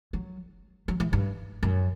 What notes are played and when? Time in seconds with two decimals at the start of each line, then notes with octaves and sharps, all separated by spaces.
0.13 F#3
0.88 F#3
1.00 E3
1.13 G2
1.63 F#2